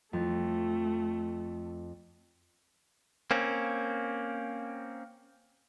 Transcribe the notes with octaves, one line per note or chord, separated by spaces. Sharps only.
F2 A3
A#3 C4 C#4